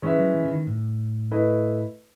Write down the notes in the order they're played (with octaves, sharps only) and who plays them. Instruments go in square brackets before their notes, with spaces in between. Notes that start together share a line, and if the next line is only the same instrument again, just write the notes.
[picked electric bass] E3 [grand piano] G#3 C#4 E4 B4 E5
[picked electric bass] F#3
E3
C#3
D#3
A2
[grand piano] A3 E4 B4 D#5